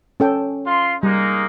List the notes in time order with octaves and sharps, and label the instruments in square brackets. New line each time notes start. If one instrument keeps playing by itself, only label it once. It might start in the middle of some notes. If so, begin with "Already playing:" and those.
[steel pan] C#4 A4 G5
[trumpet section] F4 C6
[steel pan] G3 [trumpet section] G#3 A#3 D#4